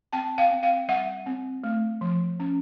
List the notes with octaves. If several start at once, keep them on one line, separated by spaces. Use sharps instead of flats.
C4 G5 A5
F5 G5
C4
F5 G5
G3 E5 F#5
C4
A3
F3
C#4